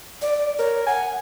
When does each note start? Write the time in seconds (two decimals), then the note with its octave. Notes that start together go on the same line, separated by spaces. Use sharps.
0.22 D5
0.59 A#4 C#5
0.87 F#5 G#5